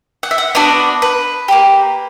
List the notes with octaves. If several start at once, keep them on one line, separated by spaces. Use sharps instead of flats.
F#5
E5
F#5
B3 D4 F#4 D5
B4
A#3 D4 G4